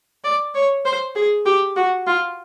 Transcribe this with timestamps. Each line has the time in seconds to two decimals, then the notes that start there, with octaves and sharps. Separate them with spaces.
0.24 D5
0.55 C#5
0.85 C5
1.15 G#4
1.45 G4
1.76 F#4
2.07 F4